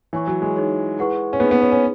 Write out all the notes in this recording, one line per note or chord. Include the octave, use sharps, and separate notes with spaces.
E3 C#5 G#5 C#6
F#3
G#3
D#4 G#4 C#5
E4 G#4 B4 F#5 C#6
C#4
B3 D#4 G#4 B4
B3
C#4
C#4